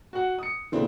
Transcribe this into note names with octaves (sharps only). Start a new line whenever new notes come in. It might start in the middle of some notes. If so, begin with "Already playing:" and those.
F#4 F#5
D#6 C#7
A#2 C#3 E3 A3 C4 D4